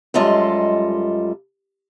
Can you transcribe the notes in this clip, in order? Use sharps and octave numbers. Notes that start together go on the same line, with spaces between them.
F#2 G3 G#3 F4 A4 D#5